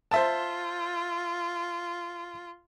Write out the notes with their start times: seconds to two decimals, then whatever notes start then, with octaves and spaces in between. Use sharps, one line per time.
0.11 F4 C5 E5 A5